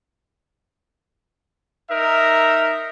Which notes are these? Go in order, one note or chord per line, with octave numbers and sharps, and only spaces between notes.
D#4 A#4 E5